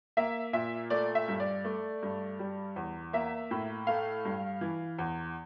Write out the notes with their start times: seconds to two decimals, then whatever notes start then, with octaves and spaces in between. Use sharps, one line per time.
0.17 A#3 E5
0.53 A#2 E5
0.90 A3 D5
1.15 E5
1.28 G2
1.40 D5
1.65 A3
2.03 G2
2.39 G3
2.76 E2
3.13 A#3 E5
3.51 A2
3.87 A3 F5
4.25 G2
4.61 E3
4.99 E2